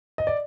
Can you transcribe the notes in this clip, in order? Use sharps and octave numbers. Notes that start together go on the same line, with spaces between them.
D#5
D5